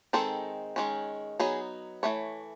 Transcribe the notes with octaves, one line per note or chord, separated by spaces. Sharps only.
D#3 G#3 C4 D#4 A4
D#3 G#3 C#4
F#3 B3 D#4 G#4
E3 A3 C#5